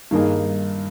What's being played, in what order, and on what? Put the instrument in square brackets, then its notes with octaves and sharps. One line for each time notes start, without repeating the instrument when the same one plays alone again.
[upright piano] G2 D#3 A#3 D#4 G#4